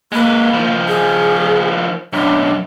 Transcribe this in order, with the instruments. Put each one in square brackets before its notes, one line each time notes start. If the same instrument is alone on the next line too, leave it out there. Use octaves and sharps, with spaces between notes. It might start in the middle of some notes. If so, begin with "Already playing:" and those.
[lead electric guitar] G#3 B4 [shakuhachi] A#3
[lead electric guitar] D#3 F3
[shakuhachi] G#4
[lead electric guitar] B1 F#2 [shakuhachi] D4